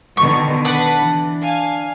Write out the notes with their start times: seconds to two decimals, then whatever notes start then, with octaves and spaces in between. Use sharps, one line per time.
0.17 B2 D3 D#3 C#6
0.65 D4 B4 F#5
0.98 E3
1.42 F5 G#5